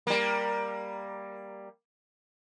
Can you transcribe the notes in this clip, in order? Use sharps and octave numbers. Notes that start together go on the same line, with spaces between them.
G3 A#3